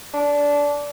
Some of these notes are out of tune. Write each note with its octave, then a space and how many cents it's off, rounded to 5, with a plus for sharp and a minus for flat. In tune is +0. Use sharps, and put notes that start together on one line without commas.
D4 -15